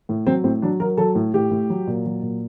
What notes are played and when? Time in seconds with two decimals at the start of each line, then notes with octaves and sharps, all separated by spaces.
0.09 A2
0.27 F#3 C4
0.44 A2 C4
0.62 F#3 D4
0.80 F#3 A#4
0.97 F#3 A4
1.15 A2
1.34 A2 G4
1.51 A2
1.70 F#3
1.87 A#2
2.05 F#3
2.22 A#2